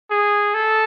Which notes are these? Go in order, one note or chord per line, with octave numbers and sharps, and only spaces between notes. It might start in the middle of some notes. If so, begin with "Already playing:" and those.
G#4
A4